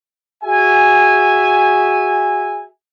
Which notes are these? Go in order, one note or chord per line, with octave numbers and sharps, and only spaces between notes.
F#4 G#4 E5 G#5